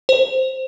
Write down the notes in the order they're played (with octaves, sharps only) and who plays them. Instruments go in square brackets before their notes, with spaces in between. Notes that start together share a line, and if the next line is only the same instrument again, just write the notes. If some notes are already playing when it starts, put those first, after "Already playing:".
[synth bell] C5